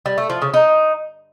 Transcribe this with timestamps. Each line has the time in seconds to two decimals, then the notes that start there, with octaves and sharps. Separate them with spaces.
0.06 G3
0.18 A3
0.30 F3
0.42 C#3
0.54 D#4